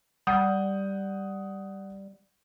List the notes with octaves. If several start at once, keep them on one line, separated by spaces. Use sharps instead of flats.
G3 F#5 D#6 G6